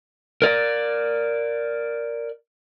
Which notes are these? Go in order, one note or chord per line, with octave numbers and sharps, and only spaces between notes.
A#4 D5